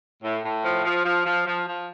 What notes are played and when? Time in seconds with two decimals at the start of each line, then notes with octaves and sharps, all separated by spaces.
0.23 A2
0.44 A2
0.64 F3
0.84 F3
1.05 F3
1.25 F3
1.46 F3
1.66 F3